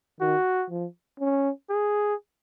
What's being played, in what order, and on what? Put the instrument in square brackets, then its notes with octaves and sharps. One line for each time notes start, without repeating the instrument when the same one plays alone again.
[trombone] D#3 [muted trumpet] F#4
[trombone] F3
C#4
[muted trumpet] G#4